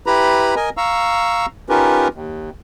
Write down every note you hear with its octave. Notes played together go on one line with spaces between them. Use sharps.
E4 G4 B4 A#5 B5
A#4 D#5 G#5
F5 A#5 C#6 E6
C#4 D#4 F4 G4 A#4 B4
D#2